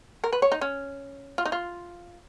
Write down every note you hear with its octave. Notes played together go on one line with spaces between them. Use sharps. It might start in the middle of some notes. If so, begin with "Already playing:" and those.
A#4
B4
C#5
D#4
C#4
F4
D#4
F4